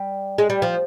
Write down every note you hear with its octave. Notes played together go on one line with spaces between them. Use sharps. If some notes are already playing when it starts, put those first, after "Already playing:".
Already playing: G3
G#3
G3
F3